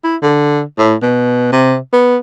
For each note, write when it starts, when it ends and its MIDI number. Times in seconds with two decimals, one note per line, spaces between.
0.04 0.16 64
0.22 0.62 50
0.78 0.95 45
1.02 1.50 47
1.52 1.77 48
1.93 2.17 59